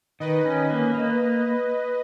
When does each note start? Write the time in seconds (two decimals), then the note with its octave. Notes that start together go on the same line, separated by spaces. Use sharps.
0.20 D#3 B4 D#5
0.45 C#4
0.70 A#3
0.94 A#3